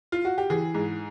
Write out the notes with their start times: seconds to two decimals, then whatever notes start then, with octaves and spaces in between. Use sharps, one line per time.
0.12 F4
0.25 F#4
0.38 G4
0.50 E3 G#4
0.75 G#2